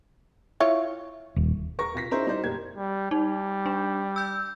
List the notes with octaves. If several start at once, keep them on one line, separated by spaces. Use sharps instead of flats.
E4 F4 C#5
D#1
A#4 C#6 A#6
C3 F4 A#6 B6
C#4 D#4 E4 G#4 A#4 C5
G3 D#4 F#4 G4 C5 D5
F#1 A#3 G4 G#6
G3
G3 D#4
D4
E6 G6